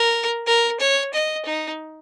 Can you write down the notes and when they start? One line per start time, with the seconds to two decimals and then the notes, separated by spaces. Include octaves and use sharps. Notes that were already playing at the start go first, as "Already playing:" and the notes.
Already playing: A#4
0.47 A#4
0.80 C#5
1.13 D#5
1.46 D#4